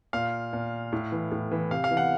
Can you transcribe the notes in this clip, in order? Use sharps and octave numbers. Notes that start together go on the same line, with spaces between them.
A#2 F5
A#2
A2
E3
A2
E3
C3 F5
F5
E3
F#5